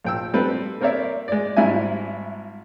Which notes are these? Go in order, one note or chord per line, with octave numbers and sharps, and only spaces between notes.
A#1 G5 E6
G3 C4 A4 B4
A#3 C4 A#4 C#5 D5 E5
G#3 D5
G#1 G#2 G3 E4 E5 G#5